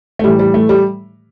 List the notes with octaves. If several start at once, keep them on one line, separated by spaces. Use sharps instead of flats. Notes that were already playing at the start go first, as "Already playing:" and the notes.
A3
A2 E3 G3
G3
A3
G3